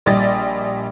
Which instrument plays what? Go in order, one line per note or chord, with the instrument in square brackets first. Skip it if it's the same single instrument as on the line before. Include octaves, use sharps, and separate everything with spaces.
[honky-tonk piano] A#1 G3 D5 D#5 A6